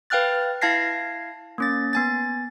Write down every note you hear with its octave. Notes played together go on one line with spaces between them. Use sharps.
B4 F5 G5 F6 F#6 A6
E4 F5 A5 G#6 A#6 C7
A#3 C#4 A6
B3 G#5 A6